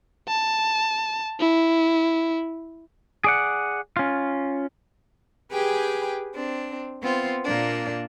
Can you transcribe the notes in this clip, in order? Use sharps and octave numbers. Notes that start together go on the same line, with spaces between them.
A5
E4
G#4 D5 F#5
C#4 F4
G4 G#4 B4 G5 G#5
C4 D4
B3 C4 F4
A#2 A#3 D4